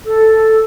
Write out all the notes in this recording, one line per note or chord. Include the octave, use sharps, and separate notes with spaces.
A4